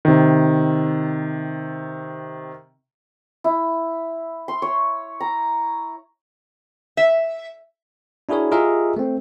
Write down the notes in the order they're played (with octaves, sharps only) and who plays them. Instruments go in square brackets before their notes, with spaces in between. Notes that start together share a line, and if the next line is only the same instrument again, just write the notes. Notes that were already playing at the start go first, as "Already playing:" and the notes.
[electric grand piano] C3 D#3
[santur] E4
C6
C#5
A#5
[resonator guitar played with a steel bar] E5
[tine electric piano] D4 E4 F#4 G#4 A#4 C#5
F4 G4 G#4 A#4 D#5 E5
A3 C4